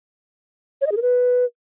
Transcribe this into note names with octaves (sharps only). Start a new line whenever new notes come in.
C#5
D#5
G#4
A#4
B4